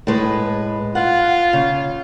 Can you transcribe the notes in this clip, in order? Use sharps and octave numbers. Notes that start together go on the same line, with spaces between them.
A2 G#3 B4
F4 F#5
C#3